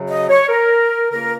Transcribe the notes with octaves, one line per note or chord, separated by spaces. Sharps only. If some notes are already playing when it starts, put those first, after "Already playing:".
Already playing: F#2 C#3 F#3
D#5
C#5
A#4
C#2 C#3 A#3 A#4